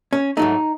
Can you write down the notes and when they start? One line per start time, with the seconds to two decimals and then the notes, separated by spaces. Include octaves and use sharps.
0.13 C#4
0.37 G#2 F#3 A3 D#4